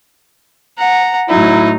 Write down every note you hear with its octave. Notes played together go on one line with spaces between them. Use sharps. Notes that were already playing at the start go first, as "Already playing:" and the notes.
F#5 A#5
A2 F#3 D#4 E4